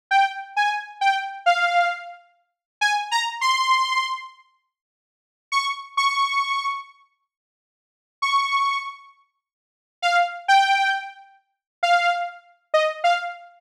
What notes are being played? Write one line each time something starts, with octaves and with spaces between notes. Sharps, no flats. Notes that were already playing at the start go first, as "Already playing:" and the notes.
G5
G#5
G5
F5
G#5
A#5
C6
C#6
C#6
C#6
F5
G5
F5
D#5
F5